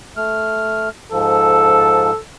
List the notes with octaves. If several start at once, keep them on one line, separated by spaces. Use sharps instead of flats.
A3 F6
G#2 F3 A4